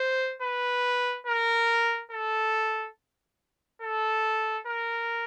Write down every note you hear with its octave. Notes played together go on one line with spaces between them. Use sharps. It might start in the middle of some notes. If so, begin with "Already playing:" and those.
Already playing: C5
B4
A#4
A4
A4
A#4